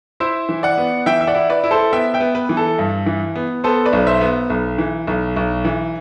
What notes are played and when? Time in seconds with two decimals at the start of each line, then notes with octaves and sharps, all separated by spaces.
0.20 E4 C5 E5
0.49 E3
0.63 D5 F#5
0.78 B3
1.06 E3 E5 G5
1.21 E5
1.27 D5 F#5
1.35 E4
1.50 B4 D5
1.64 E4
1.71 A4 C5
1.93 B3 E5 G5
2.14 E5 G5
2.20 B3
2.35 B4
2.49 E3
2.57 A4
2.79 G2
3.06 E3
3.35 B3
3.64 B3 A4 C5
3.86 B4 D5
3.93 B1
4.07 C5 E5
4.21 B3
4.50 B1
4.78 E3
5.07 B1
5.36 B1
5.65 E3